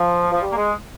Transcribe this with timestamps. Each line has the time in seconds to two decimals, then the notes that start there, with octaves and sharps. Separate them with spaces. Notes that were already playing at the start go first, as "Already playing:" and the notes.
Already playing: F3
0.32 F3
0.42 G3
0.51 A#3
0.57 G#3